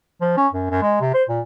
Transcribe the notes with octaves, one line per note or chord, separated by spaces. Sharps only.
F3
C#4
F#2
F#2
G#3
C3
C5
A#2